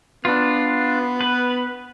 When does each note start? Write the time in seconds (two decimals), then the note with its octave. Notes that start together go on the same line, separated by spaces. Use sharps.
0.25 B3 D4 F4
1.21 B4